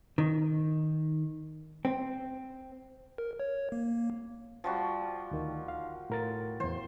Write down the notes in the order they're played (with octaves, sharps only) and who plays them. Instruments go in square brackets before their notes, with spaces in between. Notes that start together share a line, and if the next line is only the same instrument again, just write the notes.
[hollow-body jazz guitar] D#3
C4
[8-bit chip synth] A#4
C#5
A#3
[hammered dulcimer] F3 G3 F#4
[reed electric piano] D2 D#3
F5
A2 A#4 A6
[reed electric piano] E2 E3 [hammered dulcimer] C5